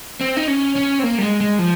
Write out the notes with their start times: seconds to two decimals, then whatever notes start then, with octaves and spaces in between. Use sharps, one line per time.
0.21 C4
0.37 D#4
0.48 C#4
0.76 C#4
0.99 C4
1.03 A#3
1.18 G3
1.22 G#3
1.41 G#3
1.59 F3